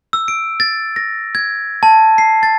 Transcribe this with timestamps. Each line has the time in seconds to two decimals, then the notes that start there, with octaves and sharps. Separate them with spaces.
0.13 E6
0.28 D7
0.60 A6
0.96 A#6
1.35 G#6
1.83 A5
2.18 C7
2.43 A6